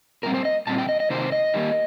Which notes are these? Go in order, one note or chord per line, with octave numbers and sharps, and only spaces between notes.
A#2 G3 C4 A#4
C5
D#5
A#2 G3 C4 A5
G5
D#5
D#5
C3 D#3 A#3 C5
D#5
D#3 G3 A#3